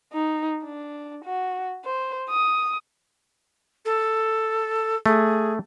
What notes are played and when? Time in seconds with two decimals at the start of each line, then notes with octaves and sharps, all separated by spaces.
0.13 D#4
0.64 D4
1.25 F#4
1.84 C5
2.30 D#6
3.85 A4
5.06 A3 G#4